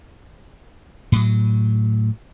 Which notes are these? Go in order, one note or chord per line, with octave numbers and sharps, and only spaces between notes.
A2 F#3